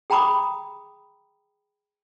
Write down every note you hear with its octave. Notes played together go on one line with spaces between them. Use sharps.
G#4 G5 A#5 B5 D6 D#6